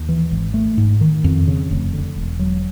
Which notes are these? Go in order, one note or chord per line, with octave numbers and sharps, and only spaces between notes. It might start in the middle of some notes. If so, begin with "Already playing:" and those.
Already playing: D#2
E3
G#1
A3
G#2
D#3
F2
C#3
F1
D3
E1
F#3